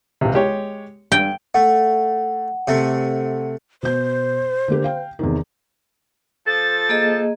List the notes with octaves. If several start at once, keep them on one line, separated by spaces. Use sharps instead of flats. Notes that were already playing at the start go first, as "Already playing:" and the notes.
C#2 C3
G#3 G4 C#5
G2 G5
A3 F#5
C3 A3
B2 C5 G6
D3 A#3 G4
F5 G5
E2 C3 D#3
F3 A4 A6
A#3 G#4 D#5